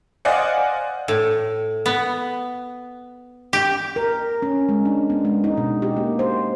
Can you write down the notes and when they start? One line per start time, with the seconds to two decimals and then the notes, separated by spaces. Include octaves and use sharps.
0.25 C5 D5 D#5 F5 F#5 G#5
1.08 A2
1.86 B3
3.53 G4
3.96 A#4
4.42 C#4
4.69 G#3
4.85 D4
5.10 B3
5.25 G#3
5.44 D#4
5.57 B2
5.82 G4
5.97 A#3
6.19 C5